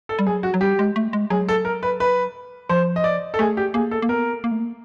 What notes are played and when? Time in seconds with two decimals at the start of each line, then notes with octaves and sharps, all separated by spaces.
0.09 A4
0.19 G3
0.27 F#3 G#4
0.43 F#4
0.54 F#3
0.61 G3 G4
0.79 G#3
0.96 A3
1.13 G#3
1.30 F#3 G#4
1.49 A4
1.65 A#4
1.83 B4
2.00 B4
2.69 F3 C5
2.96 D#5
3.04 D5
3.34 A4
3.39 A3 G#4
3.57 G4
3.74 A#3 G#4
3.91 A4
4.02 A#3
4.09 B3 A#4
4.44 A#3
4.52 A3
4.60 A#3